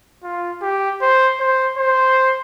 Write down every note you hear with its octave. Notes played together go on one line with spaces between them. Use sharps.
F4
G4
C5
C5
C5